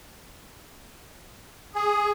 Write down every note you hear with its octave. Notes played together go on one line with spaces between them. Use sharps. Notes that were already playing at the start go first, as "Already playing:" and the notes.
G#4